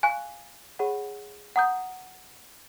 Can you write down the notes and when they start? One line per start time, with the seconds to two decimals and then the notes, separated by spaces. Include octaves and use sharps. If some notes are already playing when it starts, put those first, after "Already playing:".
0.03 F5 G#5 C#6 F#6
0.79 G#4 C#5 F#5 B5
1.56 F#5 A#5 D#6 G6